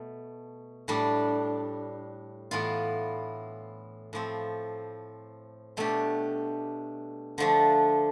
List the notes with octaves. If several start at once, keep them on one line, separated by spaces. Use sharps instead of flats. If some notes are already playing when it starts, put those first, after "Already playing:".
Already playing: B2 A3
A2 G3 D4
A2 E3 B3 F4
A2 F3 C4
B2 A3 D4 G4
D3 F3 A3 D4